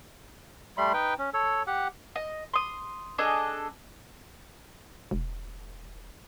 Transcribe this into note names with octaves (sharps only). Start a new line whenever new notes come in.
G3 A3 B5 C6
D#4 B4 G5
C#4
A4 C#5
G4 F#5
D#5
C6 D#6
D4 G#4 A4 D#5
E1